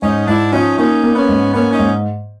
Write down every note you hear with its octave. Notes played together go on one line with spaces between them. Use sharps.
G#2 C#4 D#4
G#2 D4 E4
F3 C#4 D#4
A#3 C#4 D#4
A#3
B3 C#4
G#2
A#3 B3 C#4
C#4 D#4
G#2